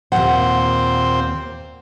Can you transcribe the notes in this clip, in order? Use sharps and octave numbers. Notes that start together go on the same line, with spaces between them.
D#2 A#2 D#3 C4 C5 F#5